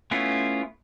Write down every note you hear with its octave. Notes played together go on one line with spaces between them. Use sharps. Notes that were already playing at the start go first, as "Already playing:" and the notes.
A3 B3 C#4 E4 F4